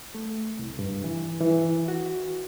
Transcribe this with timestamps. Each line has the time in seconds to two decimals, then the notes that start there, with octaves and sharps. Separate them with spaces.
0.15 A3
0.59 C2
0.79 G2
1.04 E3
1.40 E3
1.88 F#4